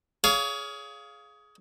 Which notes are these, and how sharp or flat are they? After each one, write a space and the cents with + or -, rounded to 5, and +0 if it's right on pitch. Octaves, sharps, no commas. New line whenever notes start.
G#4 +15 C#5 +30 F5 +0